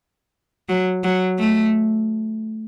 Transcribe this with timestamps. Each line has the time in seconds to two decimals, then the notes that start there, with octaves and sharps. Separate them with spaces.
0.69 F#3
1.04 F#3
1.39 A3